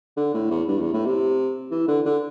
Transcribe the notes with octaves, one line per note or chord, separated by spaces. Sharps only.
D3
A2
E2
G2
E2
A2
C3
E3
D3
D3